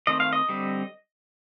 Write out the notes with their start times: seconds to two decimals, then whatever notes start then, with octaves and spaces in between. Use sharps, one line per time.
0.07 D#3 A3 C4 D#5
0.20 F5
0.33 D#5
0.49 D3 G3 C4